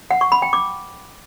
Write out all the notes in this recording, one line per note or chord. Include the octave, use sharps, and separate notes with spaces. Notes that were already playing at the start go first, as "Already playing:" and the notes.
F#5
C#6
B5
G5
D6